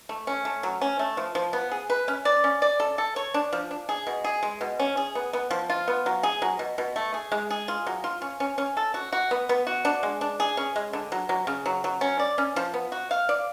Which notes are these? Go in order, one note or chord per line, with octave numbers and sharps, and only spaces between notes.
A3
C#4
A3
F#3
C#4
A3
F3
F3
B3
G#4
B4
C#4
D5
C#4
D5
A4
A4
C#5
D4
F3
D4
G#4
B2
G#4
G#3
B2
C#4
G#4
B3
B3
F3
F4
B3
F#3
G#4
F#3
B2
B2
A3
G#4
G#3
G#4
F4
F#3
F4
C#4
C#4
C#4
A4
F#4
F#4
B3
B3
F#4
D4
G#3
D4
G#4
C#4
G#3
D3
F#3
F#3
C#3
F#3
F#3
C#4
D5
C#4
F3
B3
F#4
F5
D5